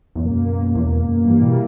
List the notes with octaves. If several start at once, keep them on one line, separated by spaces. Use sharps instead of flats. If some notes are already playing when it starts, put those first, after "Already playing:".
E2
C#2 F#2 B2 A#3
E2
F#2
G2 E3 G3 A#3
B2